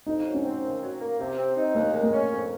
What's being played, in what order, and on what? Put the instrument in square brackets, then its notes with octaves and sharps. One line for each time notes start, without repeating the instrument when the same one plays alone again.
[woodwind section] F2 [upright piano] D#4
[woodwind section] F#3
[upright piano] C#4
[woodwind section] C4
D#2
F#3
A#3
C3
C4
D#4
[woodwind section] D#2 [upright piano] A#3
[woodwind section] G#3
[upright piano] A#3
[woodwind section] C#4
F2